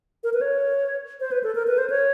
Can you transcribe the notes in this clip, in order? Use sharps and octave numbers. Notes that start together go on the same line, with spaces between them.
A#4
B4
C#5
C5
B4
A4
A#4
B4
C5
C#5